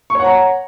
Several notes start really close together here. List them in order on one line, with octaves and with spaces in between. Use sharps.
C#6 C#5 F#5 A#5